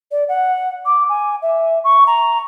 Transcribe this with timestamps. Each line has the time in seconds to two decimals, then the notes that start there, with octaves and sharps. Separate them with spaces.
0.11 D5
0.29 F#5
0.86 D6
1.09 G#5
1.42 E5
1.84 C#6
2.07 A#5